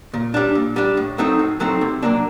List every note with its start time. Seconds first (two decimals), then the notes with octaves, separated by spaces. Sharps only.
0.14 A#2
0.34 G3 D4
0.55 A#2
0.76 G3 D4
0.97 A2
1.18 F#3 A3 C4 D#4
1.39 A2
1.60 F#3 A3 C4 D#4
1.81 C3
2.03 F#3 A#3 D4